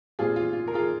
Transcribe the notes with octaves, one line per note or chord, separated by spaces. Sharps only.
A#2 G3 C4 F4 G#4
F4
F4
A#4
F4 G#4